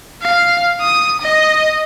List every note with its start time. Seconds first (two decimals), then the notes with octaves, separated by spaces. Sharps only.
0.22 F5
0.81 D#6
1.21 D#5